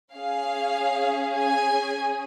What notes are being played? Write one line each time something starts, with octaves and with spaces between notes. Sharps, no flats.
C#4 G#4 F5
G#5